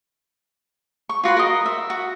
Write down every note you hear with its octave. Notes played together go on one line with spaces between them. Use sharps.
C#6
F4 F#4 B4 C6
A#4 D#5
E5
F#4